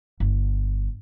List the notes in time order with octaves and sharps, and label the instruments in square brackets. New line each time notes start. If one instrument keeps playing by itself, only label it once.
[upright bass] G1